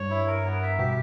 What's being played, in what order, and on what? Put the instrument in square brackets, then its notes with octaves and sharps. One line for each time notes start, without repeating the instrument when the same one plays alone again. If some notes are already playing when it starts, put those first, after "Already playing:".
Already playing: [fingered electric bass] G2 [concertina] C#5
[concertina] E4
A#4
B3
E5
[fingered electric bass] B2 [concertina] G4